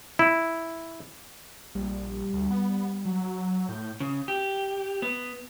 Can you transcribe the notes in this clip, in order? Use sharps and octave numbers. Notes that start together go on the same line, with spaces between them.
E4
A#1 G3
D2
B3
F#3
A2 G6
C#3
G4
B3